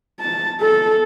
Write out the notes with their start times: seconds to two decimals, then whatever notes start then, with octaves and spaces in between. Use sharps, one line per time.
0.21 A5
0.61 A4